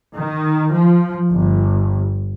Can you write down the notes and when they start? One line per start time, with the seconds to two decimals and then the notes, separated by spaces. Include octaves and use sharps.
0.14 D#3
0.71 F3
1.33 G1